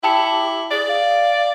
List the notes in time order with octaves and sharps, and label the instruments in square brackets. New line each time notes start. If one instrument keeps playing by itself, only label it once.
[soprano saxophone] E4 [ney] G4 [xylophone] G5 A5 C#7
[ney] G#4 [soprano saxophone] D5
[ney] F5